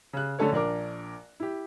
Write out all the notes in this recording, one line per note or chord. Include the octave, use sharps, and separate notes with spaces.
C#3 F#6
D3 A3 C#4 A4 C#5
A#1 D4 A#4 D6
E4 G4